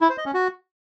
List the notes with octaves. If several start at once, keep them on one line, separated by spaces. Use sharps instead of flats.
E4
C5
D#5
C#4
F#4